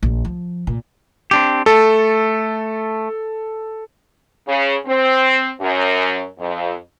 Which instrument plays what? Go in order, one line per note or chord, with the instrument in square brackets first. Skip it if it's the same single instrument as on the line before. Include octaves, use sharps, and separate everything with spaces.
[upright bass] A#1
F3
A#2
[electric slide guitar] C4 D4 G4
[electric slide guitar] A3 [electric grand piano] A4
[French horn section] C#3
C4
F#2
F2